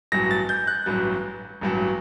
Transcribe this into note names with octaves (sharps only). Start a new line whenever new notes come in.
A1 G2 F#3 A#6
A6
G6
F#6
A1 G2 F#3
A1 G2 F#3